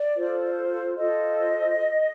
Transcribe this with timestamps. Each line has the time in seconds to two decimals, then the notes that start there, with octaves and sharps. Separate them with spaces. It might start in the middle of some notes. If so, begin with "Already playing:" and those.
Already playing: D5
0.16 F4 A4 C5
0.96 F4 A4 C5 D#5